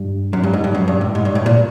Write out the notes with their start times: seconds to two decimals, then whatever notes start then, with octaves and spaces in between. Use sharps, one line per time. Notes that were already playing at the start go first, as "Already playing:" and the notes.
Already playing: G2
0.33 F#2
0.43 G2
0.53 G#2
0.64 G2
0.75 F#2
0.88 G2
1.01 A2
1.15 G#2
1.25 G2
1.35 A2
1.46 A#2